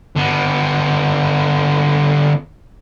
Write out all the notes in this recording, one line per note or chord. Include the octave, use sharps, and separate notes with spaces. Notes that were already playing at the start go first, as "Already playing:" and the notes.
D3 B3